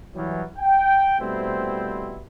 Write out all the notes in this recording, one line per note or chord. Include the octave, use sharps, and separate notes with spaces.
E3 F#3 G3
G5
B2 G3 A3 C4 E4 C5